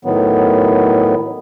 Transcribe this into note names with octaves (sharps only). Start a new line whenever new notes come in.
A2 D#3 F#3 B3